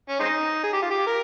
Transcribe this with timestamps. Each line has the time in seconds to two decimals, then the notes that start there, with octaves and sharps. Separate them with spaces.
0.09 C#4
0.20 G#3 C4 D#4
0.63 G#4
0.73 G4
0.82 F4
0.90 G4
1.07 A#4